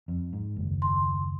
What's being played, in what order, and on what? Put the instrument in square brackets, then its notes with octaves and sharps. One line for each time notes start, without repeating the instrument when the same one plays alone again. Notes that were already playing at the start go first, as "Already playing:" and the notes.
[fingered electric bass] F2
G#2
F#1 D#2
[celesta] C6